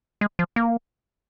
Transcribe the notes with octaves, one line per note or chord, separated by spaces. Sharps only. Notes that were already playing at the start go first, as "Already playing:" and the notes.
G#3
F3
A#3